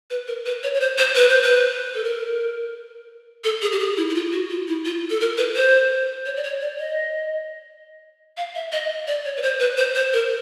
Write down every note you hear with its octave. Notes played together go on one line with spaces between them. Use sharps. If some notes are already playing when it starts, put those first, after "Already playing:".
B4
A#4
B4
C#5
C#5
C5
C5
B4
C5
B4
A4
A#4
A4
G#4
G4
G#4
E4
E4
F4
F#4
F4
E4
F4
A4
A#4
B4
C5
C#5
D5
C#5
D5
D#5
F5
E5
D#5
D5
C#5
B4
C5
B4
C5
C5
A#4